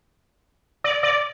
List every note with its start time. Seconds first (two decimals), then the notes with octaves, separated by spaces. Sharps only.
0.84 D5
1.03 D5